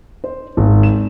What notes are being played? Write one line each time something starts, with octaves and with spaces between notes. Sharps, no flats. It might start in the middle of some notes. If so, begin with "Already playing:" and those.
C5
G#1
E7